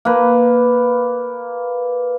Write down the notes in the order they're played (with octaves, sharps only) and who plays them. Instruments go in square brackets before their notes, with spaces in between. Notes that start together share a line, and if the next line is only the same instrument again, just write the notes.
[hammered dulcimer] A#3 B4